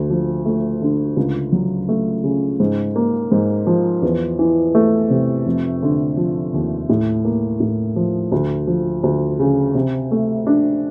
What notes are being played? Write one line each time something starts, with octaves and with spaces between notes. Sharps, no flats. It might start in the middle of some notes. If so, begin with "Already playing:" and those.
Already playing: D2
F3
A3
D3
C#2
F#3
A3
C#3
G#2
A#3
G#2
F3
E2
E3
A3
C3
F1
D3
F3
D#2
A2
A#3
A2
F3
D2
F3
D2
C#3
C3
A3
D4